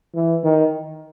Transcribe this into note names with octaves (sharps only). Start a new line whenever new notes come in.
E3
D#3